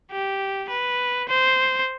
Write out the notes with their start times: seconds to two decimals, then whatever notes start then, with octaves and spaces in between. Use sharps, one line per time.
0.12 G4
0.70 B4
1.28 C5